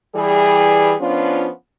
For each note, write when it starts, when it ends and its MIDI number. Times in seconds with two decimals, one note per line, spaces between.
0.15 0.94 52
0.15 0.94 55
0.15 0.94 68
1.00 1.47 53
1.00 1.47 59
1.00 1.47 61
1.00 1.47 62
1.00 1.47 65